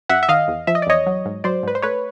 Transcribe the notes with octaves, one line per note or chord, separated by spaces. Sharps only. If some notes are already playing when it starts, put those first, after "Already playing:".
F#2 E5 F#5
E5
D#3 D#5 F5
E2
F3 E5
D#5
D5
E2 C#5 D#5
F#3
G#2
F#3 C5 D5
G#2 B4
C5
A3 B4 C#5